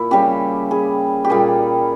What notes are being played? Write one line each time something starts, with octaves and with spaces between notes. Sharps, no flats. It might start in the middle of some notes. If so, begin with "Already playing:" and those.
Already playing: A#2 E4
C#3 G3 G4
G#4
G4
A#2 G3 G#4